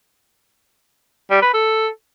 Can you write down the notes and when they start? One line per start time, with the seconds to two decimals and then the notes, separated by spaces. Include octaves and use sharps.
1.30 G3
1.42 B4
1.53 A4